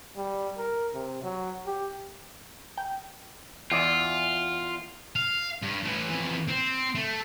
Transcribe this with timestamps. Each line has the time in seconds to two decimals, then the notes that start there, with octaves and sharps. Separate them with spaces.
0.16 G3
0.58 A#4
0.94 C3
1.23 F#3
1.66 G4
2.77 G5
3.71 E2 F4 D5 E5
5.16 F5
5.62 G2
5.83 A2 E3
6.10 F2 E3
6.48 C4
6.95 A3